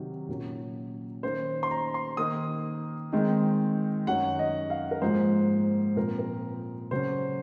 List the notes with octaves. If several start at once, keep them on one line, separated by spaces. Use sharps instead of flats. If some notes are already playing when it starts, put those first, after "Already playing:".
Already playing: C3 D#3 F#3
A#2 F#3 A#3 C#4
D#3 A#3 C#4 C5
C6
A#5
C6
D#3 A#3 D#4 D#6
D#3 G#3 C4 D#4
F#2 D#3 F#3 C#4 F#5
D#5
F5
A#4
G#2 F3 A#3 C5
A#2 F3 C4 A#4
A#4
C#3 F#3 C#4 C5